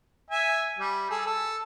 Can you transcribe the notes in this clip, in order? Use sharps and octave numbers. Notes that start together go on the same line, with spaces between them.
E5 G#5
G3
G#4 A4
A4